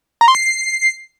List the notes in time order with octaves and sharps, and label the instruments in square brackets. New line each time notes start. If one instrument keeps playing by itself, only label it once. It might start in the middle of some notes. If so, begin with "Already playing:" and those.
[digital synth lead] A#5
C6
C7